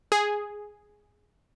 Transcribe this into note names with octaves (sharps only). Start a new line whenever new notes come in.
G#4